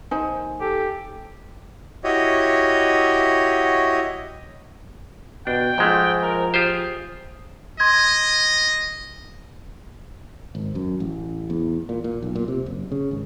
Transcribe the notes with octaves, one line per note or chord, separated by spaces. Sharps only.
A#1 D#4 C5 G#5
G4 A4
E4 F#4 G4 C#5 D#5
B2 D4 G5
G#2 F3 G#3 A3
A#4
F4 G4 G#4 C5
D#5 C6 G#6
G#1
F#2
A1
E2
A#2
A#2
B1
A#2
C3
F#1
C#3
G#1